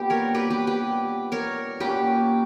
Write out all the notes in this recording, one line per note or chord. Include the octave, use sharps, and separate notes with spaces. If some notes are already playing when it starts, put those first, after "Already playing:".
Already playing: A#2 G3 B3 D4 G4
A#4 C#5
G4 B4
G4 B4
G4 B4
A#4 C#5
A#2 A#3 C#4 F#4 G4 B4